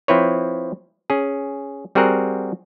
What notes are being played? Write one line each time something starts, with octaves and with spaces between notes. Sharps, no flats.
F3 C4 E4 B4 C#5
C#4 G#4
G3 C4 F#4 G#4 A#4 F#5